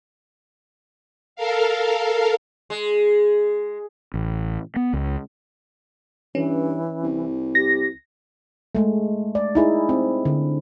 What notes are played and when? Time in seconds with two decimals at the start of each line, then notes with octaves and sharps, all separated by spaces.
1.36 A4 A#4 F5
2.70 G#3
4.14 A1
4.76 B3
4.93 C#2
6.35 G2 E3 C#4
7.03 C2
7.55 G4 A#6
8.75 G#3 A3
9.35 D5
9.55 D#4 E4 G#4
9.89 C4
10.25 D3